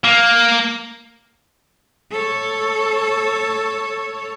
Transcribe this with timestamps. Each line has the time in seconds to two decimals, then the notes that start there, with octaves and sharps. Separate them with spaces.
0.04 A#3
2.11 A4 C#5